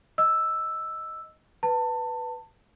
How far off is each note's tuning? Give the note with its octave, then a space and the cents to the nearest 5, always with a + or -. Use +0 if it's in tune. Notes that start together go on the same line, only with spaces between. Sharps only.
D#5 +0 E6 +0
B4 +0 A5 +25